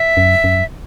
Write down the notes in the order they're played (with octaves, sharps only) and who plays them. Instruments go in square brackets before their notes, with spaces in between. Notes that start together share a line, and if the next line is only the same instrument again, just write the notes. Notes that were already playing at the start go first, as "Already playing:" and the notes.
Already playing: [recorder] E5
[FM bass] F#2
F#2